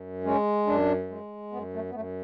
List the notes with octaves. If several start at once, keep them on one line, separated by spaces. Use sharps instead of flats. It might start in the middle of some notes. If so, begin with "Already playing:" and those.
Already playing: F#2
G#3 C#4
F#2 D4
G#3
F#2 B3
A3
B3
F#2 A3